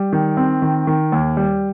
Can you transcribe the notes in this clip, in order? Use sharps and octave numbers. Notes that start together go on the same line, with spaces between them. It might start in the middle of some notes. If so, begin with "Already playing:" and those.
Already playing: G3
D#3
C4
D#3
D#3
D#2
G3